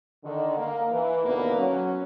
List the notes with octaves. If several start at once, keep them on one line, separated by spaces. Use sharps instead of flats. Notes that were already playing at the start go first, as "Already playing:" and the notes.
D3 D#3
A#3
E3
D#2 B2 D3 E3 A#3 B3
F#3 C#4